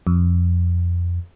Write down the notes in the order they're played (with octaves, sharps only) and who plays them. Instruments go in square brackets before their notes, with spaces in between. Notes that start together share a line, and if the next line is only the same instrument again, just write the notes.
[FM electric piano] F2